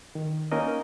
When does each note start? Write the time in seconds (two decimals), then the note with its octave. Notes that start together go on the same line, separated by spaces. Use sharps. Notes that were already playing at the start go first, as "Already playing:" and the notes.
0.15 D#3
0.52 A#3 C#4 D#4 A#4 D#5